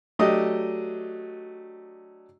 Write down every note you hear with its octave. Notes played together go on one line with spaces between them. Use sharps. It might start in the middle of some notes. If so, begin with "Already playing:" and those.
F#3 A3 D4 G4 D#5 D#6